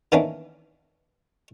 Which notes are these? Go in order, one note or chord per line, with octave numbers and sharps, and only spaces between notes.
D#3 E3 A#3 B3 C#4 D4